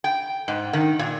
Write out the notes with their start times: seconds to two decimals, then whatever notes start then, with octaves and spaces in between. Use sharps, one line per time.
0.04 G5
0.48 G#2
0.73 D#3
0.99 A#2